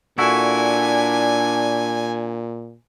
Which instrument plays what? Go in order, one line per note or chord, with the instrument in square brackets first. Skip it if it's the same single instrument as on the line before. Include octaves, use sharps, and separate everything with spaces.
[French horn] A#2 [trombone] D4 [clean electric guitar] E4 F#4 A4 [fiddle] G#5